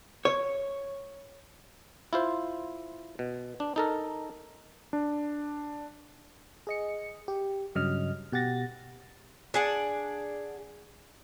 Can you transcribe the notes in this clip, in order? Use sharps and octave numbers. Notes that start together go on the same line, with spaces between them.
C#5
E4 F4 C5
B2
D4
D#4 A4 A#4
D4
G#4 D#5 C#7
G4
G2 C#3 F#3 D#5 F6
B2 G4 F#5 A6 A#6
D4 G#4 F#5